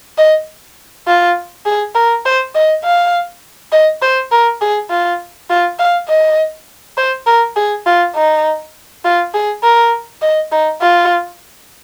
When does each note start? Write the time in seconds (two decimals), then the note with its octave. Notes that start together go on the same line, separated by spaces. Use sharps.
0.18 D#5
1.07 F4
1.66 G#4
1.95 A#4
2.26 C5
2.55 D#5
2.84 F5
3.72 D#5
4.02 C5
4.32 A#4
4.61 G#4
4.90 F4
5.50 F4
5.79 F5
6.09 D#5
6.97 C5
7.27 A#4
7.56 G#4
7.86 F4
8.15 D#4
9.05 F4
9.34 G#4
9.63 A#4
10.22 D#5
10.52 D#4
10.82 F4